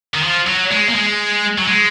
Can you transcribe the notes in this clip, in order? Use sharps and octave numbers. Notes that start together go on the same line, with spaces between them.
D#3
F3
F#3
G#3
A#3
G#3
F#3
G#3